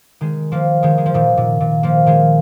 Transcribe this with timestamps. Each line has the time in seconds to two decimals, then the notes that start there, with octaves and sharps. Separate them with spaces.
0.21 D#3 G#3
0.52 F3 A#3
0.83 D#3 G#3
0.98 G#3
1.06 F3
1.14 A#2 D#3
1.37 A#2
1.60 A#2
1.83 F3 A#3
2.06 D#3 G#3